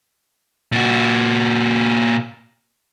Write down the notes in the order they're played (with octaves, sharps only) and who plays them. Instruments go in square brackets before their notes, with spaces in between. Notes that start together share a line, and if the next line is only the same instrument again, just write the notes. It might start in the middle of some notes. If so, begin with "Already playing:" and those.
[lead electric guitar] A#2 F#4